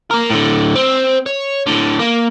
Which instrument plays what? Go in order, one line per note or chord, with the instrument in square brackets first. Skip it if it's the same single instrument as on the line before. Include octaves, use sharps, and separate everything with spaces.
[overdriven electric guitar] A#3 A#4
A2 D3
C4
C#5
A2 D3
A#3